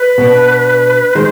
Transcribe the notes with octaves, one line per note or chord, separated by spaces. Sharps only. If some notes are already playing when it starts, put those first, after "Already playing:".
Already playing: B4
B2 B3 D4
D#3 G#3 C5